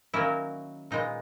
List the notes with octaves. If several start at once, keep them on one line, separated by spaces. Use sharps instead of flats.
D#3 F#3 A#3 C#4 E4
A#2 G#3 B3 D#4